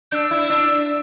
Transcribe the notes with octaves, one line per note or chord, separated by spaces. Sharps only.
D4 E6 G6
E4
D4